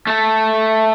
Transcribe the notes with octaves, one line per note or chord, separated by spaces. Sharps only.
A3 A4